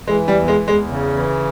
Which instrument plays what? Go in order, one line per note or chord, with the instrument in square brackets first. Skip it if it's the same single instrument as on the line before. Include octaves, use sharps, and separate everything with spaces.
[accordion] E3 [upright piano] G#3
[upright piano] G3
[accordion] E2
[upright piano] G#3
[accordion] E2
[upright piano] G#3
[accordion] C#3
E3